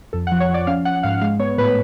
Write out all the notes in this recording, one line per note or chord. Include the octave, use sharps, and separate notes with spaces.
F2 A4
F#5
F3
C#5
F3
D5
C#4 F5
C#4 F#5
G#2 F5
G#3 F5
B3 C#5
A2 B4